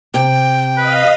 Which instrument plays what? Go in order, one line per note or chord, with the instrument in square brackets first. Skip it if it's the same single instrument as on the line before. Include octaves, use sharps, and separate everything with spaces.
[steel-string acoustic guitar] C3 [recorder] G5
[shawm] B4 [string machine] D#5 F5